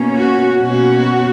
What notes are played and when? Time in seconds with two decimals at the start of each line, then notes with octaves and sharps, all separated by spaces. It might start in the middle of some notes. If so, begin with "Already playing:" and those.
Already playing: B2 A#3 C#4
0.16 F#4
0.59 B2 A#3 C#4 F#4